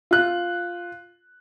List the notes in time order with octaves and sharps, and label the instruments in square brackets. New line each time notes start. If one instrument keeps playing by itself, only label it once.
[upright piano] F4 F#6